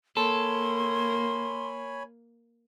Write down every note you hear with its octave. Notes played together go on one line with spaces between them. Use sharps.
A#3 A4 C#5 G#5 B5 C6